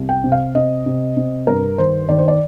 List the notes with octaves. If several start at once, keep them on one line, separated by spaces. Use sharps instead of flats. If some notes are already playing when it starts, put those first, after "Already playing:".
Already playing: C2
G5
C3
F5
C3 D#5
C3
C3
G2 A#4
D#3 C5
D#3 D5
C5
D5